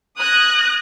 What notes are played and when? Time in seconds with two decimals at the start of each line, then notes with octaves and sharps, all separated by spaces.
0.18 D#6 F#6 G#6 A#6